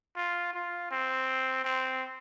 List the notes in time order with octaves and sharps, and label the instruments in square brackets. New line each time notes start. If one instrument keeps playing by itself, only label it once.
[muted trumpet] F4
F4
C4
C4